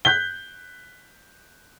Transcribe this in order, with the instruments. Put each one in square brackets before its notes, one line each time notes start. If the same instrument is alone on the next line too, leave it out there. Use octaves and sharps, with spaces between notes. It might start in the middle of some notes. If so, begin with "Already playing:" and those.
[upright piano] F#6 G6 B6 G7